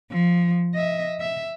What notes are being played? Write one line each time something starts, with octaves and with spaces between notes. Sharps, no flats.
F3
D#5 E5
E5